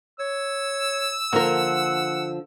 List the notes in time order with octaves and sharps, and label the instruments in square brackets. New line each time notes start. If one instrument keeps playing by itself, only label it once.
[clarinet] C#5 [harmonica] E6
[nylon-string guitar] D3 F3 [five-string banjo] A#3 A#4 [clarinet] F#5